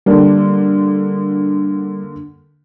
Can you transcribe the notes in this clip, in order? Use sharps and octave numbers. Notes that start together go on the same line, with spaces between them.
D3 G3 A#3 D4